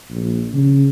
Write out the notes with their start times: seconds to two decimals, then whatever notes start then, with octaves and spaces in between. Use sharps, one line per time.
0.11 A#1
0.54 C#3